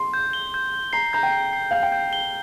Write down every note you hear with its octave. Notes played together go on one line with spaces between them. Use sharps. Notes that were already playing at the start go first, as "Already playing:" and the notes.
Already playing: C6
G6
G7
G6
G6
A#5 C7
A#5 G6
G5
C7
C7
F5 G6
G5
G6
G7